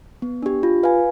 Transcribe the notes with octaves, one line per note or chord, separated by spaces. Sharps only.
B3
D4 G4
F4
B4 F5 G#5